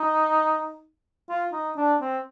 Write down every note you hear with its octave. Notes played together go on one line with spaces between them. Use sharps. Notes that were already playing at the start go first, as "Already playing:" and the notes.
Already playing: D#4
F4
D#4
D4
C4